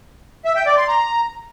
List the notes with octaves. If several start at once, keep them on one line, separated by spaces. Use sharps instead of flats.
E5
G5
D5
C6
A#5